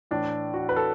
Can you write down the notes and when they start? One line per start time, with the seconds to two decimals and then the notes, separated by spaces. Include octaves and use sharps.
0.11 A2 E3 D4
0.54 F#4
0.69 B4
0.76 A4